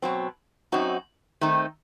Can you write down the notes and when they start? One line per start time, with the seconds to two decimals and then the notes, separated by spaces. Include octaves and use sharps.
0.02 B2 F#3 C4
0.72 F#2 F#3 C4 D#4 F#4
1.41 D#3 A3 C4 D#4